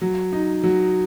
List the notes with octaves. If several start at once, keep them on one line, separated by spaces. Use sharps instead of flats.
F#3
D#4
F#3